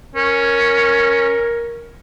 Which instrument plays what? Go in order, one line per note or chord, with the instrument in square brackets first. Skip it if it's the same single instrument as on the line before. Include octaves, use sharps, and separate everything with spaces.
[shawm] C#4 [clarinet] A#4